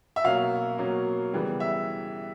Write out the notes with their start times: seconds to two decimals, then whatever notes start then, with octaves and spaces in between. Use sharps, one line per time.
0.16 E5
0.24 B2 F#3 A#3 C#4 F5
0.78 B2 F#3 A#3 C#4
1.33 C#3 E3 G3 B3
1.60 E5